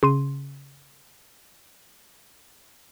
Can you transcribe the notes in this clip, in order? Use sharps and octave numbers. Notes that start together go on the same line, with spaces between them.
C#3 C6 D#7